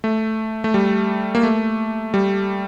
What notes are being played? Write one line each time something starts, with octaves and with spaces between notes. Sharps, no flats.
A3
A3
G3
A#3
A3
G3